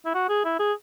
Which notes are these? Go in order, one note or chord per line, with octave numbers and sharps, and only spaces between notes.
E4
F#4
G#4
E4
G#4